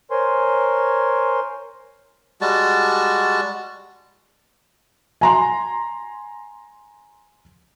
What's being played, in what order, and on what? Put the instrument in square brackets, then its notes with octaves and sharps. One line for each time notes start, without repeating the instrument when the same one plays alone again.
[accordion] A#4 C5 C#5 G#5 C6
[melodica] G3 G#3 F#4 A5
[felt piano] G#5 A#5 C6